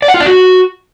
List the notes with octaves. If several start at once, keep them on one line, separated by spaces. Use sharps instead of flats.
D5
F#5
F4
D4
F#4